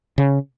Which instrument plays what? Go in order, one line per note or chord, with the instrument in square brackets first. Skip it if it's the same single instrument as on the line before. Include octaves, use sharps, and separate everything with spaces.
[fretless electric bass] C#3